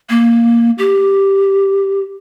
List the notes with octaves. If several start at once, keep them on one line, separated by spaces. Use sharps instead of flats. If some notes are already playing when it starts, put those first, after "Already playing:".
A#3
G4